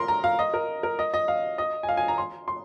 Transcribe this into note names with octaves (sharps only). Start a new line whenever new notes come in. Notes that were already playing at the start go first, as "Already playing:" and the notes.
Already playing: A#4 C6
A#5
F5
D#5
A#4
A#4
D#5
D#5
F5
D#5
G#5
F5
G#5
A#5
C6
C6